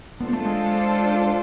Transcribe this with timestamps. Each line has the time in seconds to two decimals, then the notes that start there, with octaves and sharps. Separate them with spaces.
0.20 B3 D4 F4 A4 C5
0.33 A3
0.45 G#3